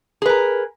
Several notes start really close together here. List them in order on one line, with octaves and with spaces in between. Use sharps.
G#4 B4 A#4